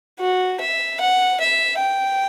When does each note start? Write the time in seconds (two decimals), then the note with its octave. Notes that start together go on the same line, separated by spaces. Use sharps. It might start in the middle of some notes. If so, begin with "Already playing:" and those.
0.20 F#4
0.61 E5
1.01 F#5
1.40 E5
1.80 G5